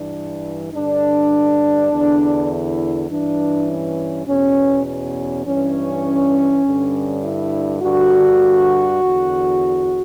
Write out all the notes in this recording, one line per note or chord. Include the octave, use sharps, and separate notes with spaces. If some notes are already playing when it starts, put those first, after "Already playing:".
Already playing: G2 E3 D4
G2 D3 D4
E2 D3
E4
G2 E3 D4
C#4
E2 B2 C#4
C#4
G2 E3 C#4
G2 D3
E4
G2 D3 F#4
E2 D3